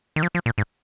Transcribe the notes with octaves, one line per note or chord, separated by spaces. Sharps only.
D#3
F3
F3
A#2
G#2